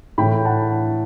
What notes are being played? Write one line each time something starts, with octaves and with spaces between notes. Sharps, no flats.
A2 E3 A3 G5 B5
G5
F#5 A5